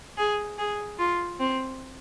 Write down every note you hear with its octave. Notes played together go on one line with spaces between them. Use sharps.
G#4
G#4
F4
C4